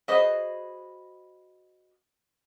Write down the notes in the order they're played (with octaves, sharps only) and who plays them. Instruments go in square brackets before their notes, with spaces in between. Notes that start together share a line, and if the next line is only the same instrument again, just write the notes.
[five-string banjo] F#4 G#4 B4 C5 D#5